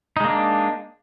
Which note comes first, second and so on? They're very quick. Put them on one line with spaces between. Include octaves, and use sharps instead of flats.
D#4 G#3 A#3 D4